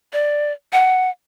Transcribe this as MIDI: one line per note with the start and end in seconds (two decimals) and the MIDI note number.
0.13 0.52 74
0.73 1.09 78